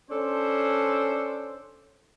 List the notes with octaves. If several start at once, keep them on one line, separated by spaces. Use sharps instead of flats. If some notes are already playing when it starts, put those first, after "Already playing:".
C#4 D4 A4 C5